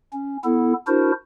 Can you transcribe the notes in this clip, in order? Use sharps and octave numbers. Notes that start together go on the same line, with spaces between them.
C#4
B3 E4 A4
D4 E4 F#4 A#4 C5